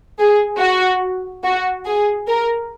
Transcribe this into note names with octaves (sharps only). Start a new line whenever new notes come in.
G#4
F#4
F#4
G#4
A#4